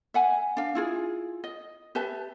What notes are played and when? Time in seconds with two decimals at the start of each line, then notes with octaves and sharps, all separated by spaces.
0.14 E5 F#5 G#5
0.57 D4 F5
0.75 E4 F4 G#4
1.44 D#5
1.95 G4 B4 E5 A5